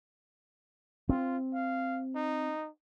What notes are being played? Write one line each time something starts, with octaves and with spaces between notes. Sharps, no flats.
C4 F4
F5
D#4